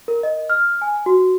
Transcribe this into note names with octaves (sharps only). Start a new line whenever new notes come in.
A#4
D#5
F6
G#5
F#4